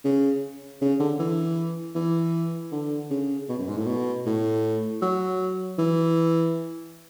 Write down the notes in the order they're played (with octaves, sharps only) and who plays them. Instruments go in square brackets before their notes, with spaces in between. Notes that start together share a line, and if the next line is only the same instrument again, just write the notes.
[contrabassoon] C#3
C#3
D3
E3
E3
D3
C#3
B2
F#2
G#2
A2
B2
A2
F#3
E3